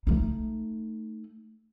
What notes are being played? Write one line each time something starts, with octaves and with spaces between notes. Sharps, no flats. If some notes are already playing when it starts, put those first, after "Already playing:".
A3 D#4